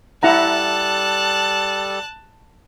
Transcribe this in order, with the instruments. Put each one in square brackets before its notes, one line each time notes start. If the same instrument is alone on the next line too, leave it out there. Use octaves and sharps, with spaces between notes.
[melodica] G3 A4 [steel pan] E4 F#5 A#5 [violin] A5 F#6